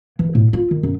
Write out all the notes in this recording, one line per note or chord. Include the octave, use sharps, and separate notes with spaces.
E3
A2
F4
D#3
F#2